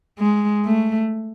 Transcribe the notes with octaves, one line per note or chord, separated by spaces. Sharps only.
G#3
A3